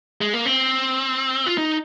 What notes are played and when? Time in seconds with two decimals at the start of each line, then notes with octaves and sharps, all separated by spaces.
0.21 G#3
0.33 A#3
0.46 C4
1.46 F4
1.58 D#4